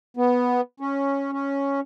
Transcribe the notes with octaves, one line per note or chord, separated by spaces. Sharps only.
B3
C#4
C#4